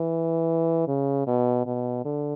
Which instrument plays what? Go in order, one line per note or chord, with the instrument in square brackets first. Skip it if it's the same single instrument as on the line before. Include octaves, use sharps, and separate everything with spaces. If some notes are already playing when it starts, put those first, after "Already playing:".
Already playing: [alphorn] E3
C#3
B2
B2
D3